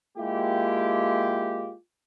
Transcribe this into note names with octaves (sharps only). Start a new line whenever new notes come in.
G#3 A#3 E4 F4 G4